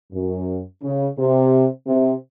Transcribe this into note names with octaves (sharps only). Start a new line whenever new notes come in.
F#2
C#3
C3
C3